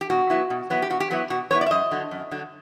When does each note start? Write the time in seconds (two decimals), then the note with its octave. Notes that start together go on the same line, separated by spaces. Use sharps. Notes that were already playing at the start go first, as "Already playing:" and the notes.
0.01 G4
0.10 B2 F#4
0.30 F#3 B3 E4
0.50 B2
0.70 F#3 B3 E4
0.82 G4
0.90 B2 F#4
1.00 G4
1.10 F#3 B3 E4 F#4
1.30 B2 F#4
1.51 F#3 B3 E4 C#5
1.61 D5
1.66 E5
1.71 F#2 D#5
1.91 D3 F#3
2.11 F#2
2.31 D3 F#3